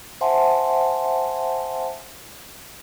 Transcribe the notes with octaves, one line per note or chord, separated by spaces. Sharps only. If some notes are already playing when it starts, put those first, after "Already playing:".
C5 E5 F#5 G#5 A5 C6